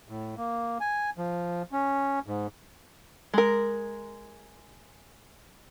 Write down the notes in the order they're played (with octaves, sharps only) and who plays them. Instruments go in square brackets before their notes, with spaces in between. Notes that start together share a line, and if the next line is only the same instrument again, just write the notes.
[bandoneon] A2
A#3
G#5
F3
C#4
G#2
[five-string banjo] G#3 A#4